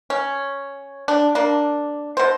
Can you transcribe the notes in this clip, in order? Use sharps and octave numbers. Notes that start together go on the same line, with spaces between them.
C#4
D4
A#3 D4
B2 C5